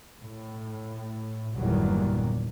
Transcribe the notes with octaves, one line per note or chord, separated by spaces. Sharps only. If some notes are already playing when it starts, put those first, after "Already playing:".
A2
G1 E2 A#2 D#3 F#3 G3